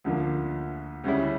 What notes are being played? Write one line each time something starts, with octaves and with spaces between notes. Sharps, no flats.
D2 D3 F3 A#3
D2 C#3 G3 C#4 E4